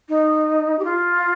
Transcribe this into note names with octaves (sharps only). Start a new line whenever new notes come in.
D#4
G4
F4